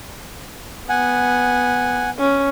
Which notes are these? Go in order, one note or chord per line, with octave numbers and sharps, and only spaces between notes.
B3 F#5 G#5
C#4